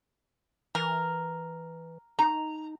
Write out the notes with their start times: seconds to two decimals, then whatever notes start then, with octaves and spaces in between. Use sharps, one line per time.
0.75 E3 A#4
2.19 D#4 A#5